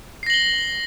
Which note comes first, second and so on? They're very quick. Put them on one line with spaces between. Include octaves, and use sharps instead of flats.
C7 A#6 F#7 G7